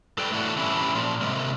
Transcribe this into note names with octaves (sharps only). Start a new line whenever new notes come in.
G#2 A4 B4 D5 G5
A2 D3 E3 D4 F#4
E3 G3 C#4 D4 E4
A#2 F3
C3 G#3 A#3